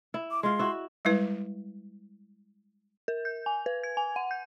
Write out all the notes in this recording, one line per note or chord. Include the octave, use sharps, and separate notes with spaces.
E4
D6
G#3 F4 C6
E4 F#4
G3 G#3 E4 B4
A#4
G6
G#5
B4
G#6
G#5
F#5
G6